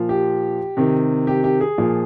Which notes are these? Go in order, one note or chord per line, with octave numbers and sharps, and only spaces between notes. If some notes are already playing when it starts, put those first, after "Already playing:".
Already playing: A#2 F3
G4
C3 D#3
G4
G4
G#4
A#2 F3